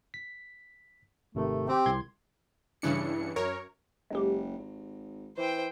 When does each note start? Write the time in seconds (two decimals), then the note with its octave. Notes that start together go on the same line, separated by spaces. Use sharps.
0.14 B6
1.35 G#1 C3 D#3 A3
1.68 C4 G4
1.86 C2 C6 G#6
2.82 G2 C#3 E3 D4 C#7
3.36 F#2 A#4 C#5
4.10 F#1 G#3 G4
4.58 G#1
5.37 E3 C5 G5